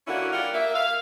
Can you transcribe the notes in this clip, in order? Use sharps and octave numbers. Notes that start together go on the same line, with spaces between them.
D3 A#3 C#4 D4 E4 F#4
G3 F4 A#4 F#5
A#3 E5
F5